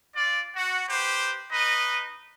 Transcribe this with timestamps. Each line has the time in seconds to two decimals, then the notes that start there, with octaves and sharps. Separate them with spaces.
0.15 F4 D5
0.55 F#4
0.88 G4 B4 C5
1.50 D#4 B4 D#5